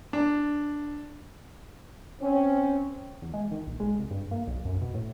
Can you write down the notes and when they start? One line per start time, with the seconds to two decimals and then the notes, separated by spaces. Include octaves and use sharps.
0.13 D4
2.21 C4 C#4
3.22 E2
3.34 G#3
3.51 D#3
3.66 A#1
3.80 G#3
3.99 C2
4.11 G2
4.31 A#3
4.47 B1
4.65 F#2
4.81 B2
4.94 A2